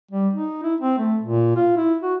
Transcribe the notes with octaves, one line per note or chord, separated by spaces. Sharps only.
G3
D#4
E4
C4
A3
A#2
F4
E4
F#4